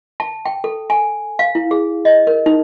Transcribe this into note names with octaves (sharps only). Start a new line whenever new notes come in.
A5
G5
A4
G#5
F5
E4
G#4
D#5
A#4
D#4